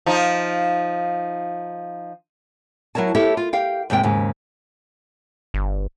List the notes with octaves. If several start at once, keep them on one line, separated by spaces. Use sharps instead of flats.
F3 D#4
F#3 E4 A#4 C#5 A5
E4 G4 A4 C#5 E5
F4
G4 F5 G5
D#2 G#2 C3 G5
D#2 G#2 C#3
G1